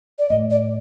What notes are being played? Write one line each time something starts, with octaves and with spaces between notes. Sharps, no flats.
D5
A2 D#5
D5